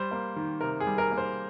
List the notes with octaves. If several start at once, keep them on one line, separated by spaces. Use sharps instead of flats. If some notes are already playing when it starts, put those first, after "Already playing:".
Already playing: G3 C5
A#3
D#3
C3 A#4
G#4
G3
A#4
A#3
C5